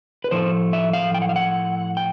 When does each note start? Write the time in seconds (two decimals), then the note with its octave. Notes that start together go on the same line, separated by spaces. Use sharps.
0.24 B4
0.31 A2 F3 A3 C5
0.73 E5
0.93 F5
1.14 G5
1.22 F#5
1.29 F5
1.36 F#5
1.97 G5